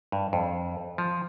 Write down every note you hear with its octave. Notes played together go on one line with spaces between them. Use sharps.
G2
F2
F3